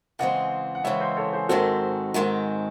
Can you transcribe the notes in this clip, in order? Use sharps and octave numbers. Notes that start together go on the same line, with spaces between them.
C#3 E3 G#3 C4 D#5 F#5
F#5
C#3 E3 G#3 C4 C#5 E5
C5 D#5
A4 C#5
G#4 C5
G#2 D#3 G#3 C4 F#4 A4
G#2 D#3 G#3 C4